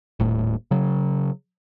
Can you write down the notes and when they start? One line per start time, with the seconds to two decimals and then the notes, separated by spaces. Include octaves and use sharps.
0.20 D#1 A2
0.71 C#3 F#3